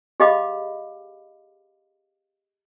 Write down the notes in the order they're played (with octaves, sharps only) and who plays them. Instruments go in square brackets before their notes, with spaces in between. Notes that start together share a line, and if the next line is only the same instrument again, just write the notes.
[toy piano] G4 G#4 D#5 F5 B5 D6